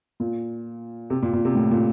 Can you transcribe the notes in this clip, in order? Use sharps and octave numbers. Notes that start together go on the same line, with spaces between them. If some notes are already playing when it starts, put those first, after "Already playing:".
A#2
C3
A#2
A#2
C3
A2
A#2